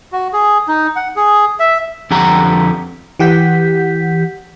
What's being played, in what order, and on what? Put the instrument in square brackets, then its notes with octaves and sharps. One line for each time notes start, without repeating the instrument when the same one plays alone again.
[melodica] F#4
G#4
D#4
F#5
G#4
E5
[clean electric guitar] F2 D3 G4 F#5 A#5
[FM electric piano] E3 G4 F#5 G6 B6